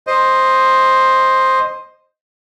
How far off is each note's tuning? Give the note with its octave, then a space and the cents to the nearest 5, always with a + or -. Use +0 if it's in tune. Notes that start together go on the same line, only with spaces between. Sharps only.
C5 +5 D#5 +0